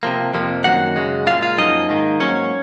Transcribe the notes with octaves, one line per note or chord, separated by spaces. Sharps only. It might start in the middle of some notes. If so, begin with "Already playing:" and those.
C3 F3 A#3
F2 C3 F3 A#3
F#2 D#3 A#3 F#4 F#5
F#2 C#3 G#3
A#2 G#3 F4 F5
F4 F5
F#2 F3 A#3 D#4 D#5
G#2 D#3 A#3
G#2 F#3 A#3 C#4 C#5